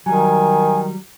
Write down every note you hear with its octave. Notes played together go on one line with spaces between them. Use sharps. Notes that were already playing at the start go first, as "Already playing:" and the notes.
D#3 F#3 G3 G#5